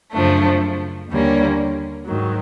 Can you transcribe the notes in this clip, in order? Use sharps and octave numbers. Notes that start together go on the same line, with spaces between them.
F#2 C#3 F3 A3 D4
D#2 D3 G3 A#3 C#4
G#2 D#3 F#3